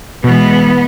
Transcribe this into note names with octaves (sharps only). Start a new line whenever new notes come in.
B2 E3 G#3 B3